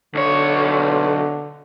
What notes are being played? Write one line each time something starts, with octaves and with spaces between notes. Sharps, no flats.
B1 D3 C#5